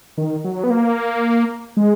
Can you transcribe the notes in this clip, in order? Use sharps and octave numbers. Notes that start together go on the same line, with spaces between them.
D#3
F#3
B3
A#3
G#3